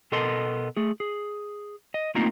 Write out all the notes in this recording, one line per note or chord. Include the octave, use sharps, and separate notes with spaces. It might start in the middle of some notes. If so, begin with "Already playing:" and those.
B2 B3 A4 A#4 D#5 C6
A3 G#4
G#4
D#5
A3 A#3 C4 D#4 F4 A#4